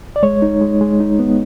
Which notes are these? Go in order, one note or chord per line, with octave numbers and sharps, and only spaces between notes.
D5
G#3 C#5
D#4
G#3
G#3
D#4
B3